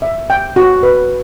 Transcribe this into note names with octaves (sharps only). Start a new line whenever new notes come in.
E5
G5
F#4
B4